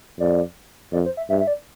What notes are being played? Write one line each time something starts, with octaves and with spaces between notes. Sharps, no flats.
F2 D5
F2 D5
C5
E5
G2 E5
E5
D5